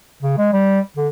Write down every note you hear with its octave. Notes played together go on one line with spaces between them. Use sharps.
C#3
G#3
G3
D3